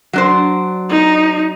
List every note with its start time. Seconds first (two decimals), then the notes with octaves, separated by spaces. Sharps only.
0.13 F#3 D4 C5
0.90 D#4